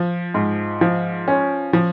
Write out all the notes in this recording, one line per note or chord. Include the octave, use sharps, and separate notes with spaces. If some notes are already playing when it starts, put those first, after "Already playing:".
Already playing: F3
G#2
F3
C#4
F3